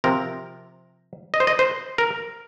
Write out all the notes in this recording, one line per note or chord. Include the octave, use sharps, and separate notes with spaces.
C3 F3 C4 A#4
D#5
C5
D#5
C5
A#4